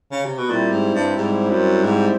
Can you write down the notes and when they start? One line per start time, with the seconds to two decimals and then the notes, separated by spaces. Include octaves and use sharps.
0.12 C#3
0.25 C3
0.38 B2
0.49 A#2 G3 C4 E4 G4 C5
0.72 G#2
0.95 G2
1.17 G#2
1.50 F#2
1.84 G#2